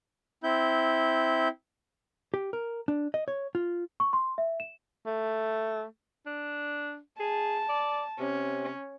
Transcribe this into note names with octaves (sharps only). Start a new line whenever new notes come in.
C4 E4 G6
G4
A#4
D4
D#5
C#5
F4
C#6
C6
E5
E7
A3
D4
G#4 A5
D5
C3 C#4